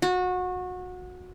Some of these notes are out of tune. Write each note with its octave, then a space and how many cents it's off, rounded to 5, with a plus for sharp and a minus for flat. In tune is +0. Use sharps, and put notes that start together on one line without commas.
F#4 -25